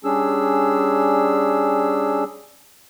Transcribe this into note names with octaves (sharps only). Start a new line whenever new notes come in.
G3 C#4 D4 G#4 E6